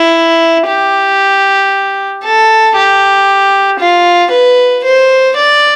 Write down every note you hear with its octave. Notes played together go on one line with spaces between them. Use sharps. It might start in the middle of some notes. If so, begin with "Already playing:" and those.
Already playing: E4
G4
A4
G4
F4
B4
C5
D5